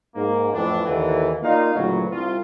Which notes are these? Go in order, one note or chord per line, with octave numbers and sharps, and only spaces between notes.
G#2 A#3
F2 A2 E3 D4
D#2 D3 E3
A#3 D#4 F4 D5 F5
D2 A#2 C#3 E3 F#3
C2 F4